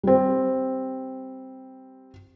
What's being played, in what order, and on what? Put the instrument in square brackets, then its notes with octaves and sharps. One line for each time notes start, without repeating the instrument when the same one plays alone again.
[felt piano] G3 C4